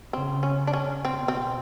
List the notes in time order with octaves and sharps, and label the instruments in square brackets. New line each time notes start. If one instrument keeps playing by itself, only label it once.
[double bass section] C#3 [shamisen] C4
[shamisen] C#4
D4
C#4
[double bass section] B2 [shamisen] C4
[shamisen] C4